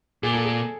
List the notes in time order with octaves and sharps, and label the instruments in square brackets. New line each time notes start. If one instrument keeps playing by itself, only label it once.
[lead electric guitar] A#2 [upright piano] G#4
[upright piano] A4
G#4